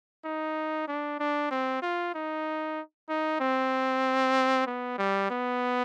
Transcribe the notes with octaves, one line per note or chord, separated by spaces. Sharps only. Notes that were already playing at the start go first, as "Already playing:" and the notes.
D#4
D4
D4
C4
F4
D#4
D#4
C4
B3
G3
B3